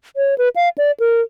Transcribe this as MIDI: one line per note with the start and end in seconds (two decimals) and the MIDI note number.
0.16 0.35 73
0.38 0.49 71
0.56 0.69 77
0.78 0.91 74
1.00 1.21 70